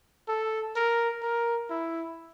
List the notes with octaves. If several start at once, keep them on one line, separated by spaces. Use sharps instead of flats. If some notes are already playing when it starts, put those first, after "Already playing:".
A4
A#4
A#4
E4